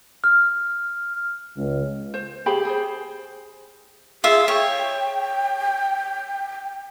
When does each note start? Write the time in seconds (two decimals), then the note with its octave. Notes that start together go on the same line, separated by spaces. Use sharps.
0.24 F6
1.57 C#2
2.14 C5
2.46 G4 G#4 C5 B5
2.65 G#4 C5
4.24 F4 G#4 E5
4.48 C#5 G5